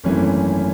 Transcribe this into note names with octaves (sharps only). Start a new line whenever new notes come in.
G#1 F#2 E3 A3 C#4